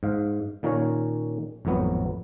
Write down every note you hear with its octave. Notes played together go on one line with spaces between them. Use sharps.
G#2 F5
A#2 D#3 A#3 C#4 A#4 C#5
G#1 F2 A2 F#3 B3